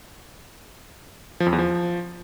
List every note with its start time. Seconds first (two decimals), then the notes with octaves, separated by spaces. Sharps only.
1.40 F3
1.46 F2
1.52 E2
1.59 F3